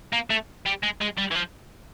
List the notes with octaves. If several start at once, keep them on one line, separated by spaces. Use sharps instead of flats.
A#3
A3
G3
G#3
G#3
G3
E3
F3